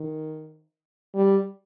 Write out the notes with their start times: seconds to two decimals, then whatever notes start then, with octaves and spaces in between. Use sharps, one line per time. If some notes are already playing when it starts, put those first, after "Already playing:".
Already playing: D#3
1.14 G3